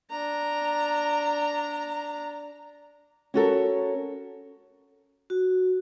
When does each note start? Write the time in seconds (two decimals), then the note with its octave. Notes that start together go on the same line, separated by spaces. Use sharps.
0.11 D4 A#5
3.34 C#4 F#4 A4 A#4
5.30 F#4